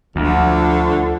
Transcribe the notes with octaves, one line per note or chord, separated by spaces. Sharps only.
D2 D3 F3